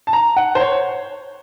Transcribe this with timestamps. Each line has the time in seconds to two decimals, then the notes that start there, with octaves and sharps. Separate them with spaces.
0.07 A5
0.13 A#5
0.36 F#5
0.55 C5
0.60 C#5